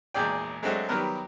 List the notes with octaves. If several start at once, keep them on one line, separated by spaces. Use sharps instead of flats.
G#1 E2 A#2 G#4 D5 G5
F#3 G#3 A3 C4 D4 F#4
D#3 F#3 G3 B3 A#4